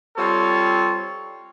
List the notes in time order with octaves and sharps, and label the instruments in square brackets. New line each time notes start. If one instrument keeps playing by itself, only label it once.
[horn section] G3 C4 F4 A4 C#5